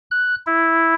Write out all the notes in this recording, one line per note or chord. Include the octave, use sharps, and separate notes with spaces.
F#6
E4